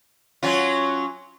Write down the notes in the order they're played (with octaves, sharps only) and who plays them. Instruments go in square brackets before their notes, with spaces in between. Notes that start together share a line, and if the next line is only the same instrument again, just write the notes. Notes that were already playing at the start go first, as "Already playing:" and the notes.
[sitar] F#3 C#4 F4